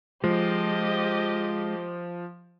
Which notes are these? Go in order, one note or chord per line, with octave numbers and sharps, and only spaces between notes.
F3 G#3 G4 D#5